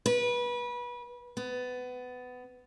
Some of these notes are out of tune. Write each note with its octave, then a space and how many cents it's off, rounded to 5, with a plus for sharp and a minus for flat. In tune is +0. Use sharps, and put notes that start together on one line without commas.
B4 -25
B3 +20